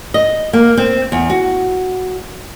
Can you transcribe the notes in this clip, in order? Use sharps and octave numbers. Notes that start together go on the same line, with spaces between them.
D#5
A#3
C4
E2
F#4